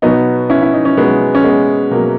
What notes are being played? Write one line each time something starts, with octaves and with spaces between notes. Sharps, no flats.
B2 F#3 B3 D#4
C#4 E4
E4
D#4
C#4
B2 F#3 G#3 B3
C#4
G#3 B3
B2 F#3 A#3